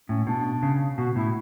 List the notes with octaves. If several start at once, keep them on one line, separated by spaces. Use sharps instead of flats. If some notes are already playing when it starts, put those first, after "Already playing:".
A2 C#4
B2 D4
C#3
B2 F#4
A2 E4